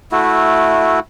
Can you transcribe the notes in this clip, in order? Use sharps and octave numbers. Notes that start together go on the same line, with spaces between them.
A3 E4 F#4